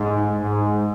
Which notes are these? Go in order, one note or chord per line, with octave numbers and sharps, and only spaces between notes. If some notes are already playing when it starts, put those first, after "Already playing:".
Already playing: G#2
G#2